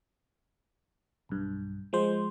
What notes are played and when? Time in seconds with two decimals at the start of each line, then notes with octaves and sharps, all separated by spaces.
1.29 B1 G2
1.93 F3 G#3 C5